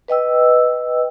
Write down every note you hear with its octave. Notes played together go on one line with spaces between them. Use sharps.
B4 D#5 G5 E6